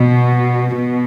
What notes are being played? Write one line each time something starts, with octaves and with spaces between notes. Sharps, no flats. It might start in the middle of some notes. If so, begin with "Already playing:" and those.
Already playing: B2
B2